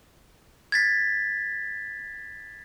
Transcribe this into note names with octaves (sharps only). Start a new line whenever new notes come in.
G#6 A6 B6